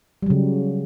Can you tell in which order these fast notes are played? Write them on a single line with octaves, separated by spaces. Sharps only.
G3 F#3 C#3